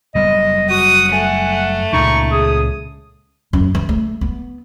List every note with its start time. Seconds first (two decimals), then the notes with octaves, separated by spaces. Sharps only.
0.15 F#1 G3 B3 D#5
0.70 F#4 F#5 D#6
1.12 A3 G#5
1.93 C#2 A#2 C#3 D#4 C#6
2.32 G#4 D#6
3.53 F#2
3.75 E3
3.89 A3
4.21 B3